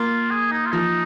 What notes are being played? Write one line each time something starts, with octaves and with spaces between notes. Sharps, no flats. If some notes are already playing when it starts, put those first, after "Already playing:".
Already playing: A#3 F4
G#4
D#4
F4
F3 D#4